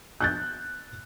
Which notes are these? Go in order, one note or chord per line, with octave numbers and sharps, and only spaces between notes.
F#6 G6 A6